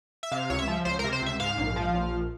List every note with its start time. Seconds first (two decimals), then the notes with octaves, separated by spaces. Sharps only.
0.23 E5
0.32 C3 F5
0.50 C#2 C#5
0.59 E5
0.68 F3
0.85 C#2 C5
0.99 A#4
1.04 C3
1.13 C5
1.22 C#2 E5
1.40 G#2 F5
1.57 A#1
1.76 F3
1.94 A#1